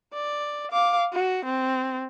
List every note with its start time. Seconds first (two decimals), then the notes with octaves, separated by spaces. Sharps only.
0.13 D5
0.71 F5 D6
1.13 F#4
1.45 C4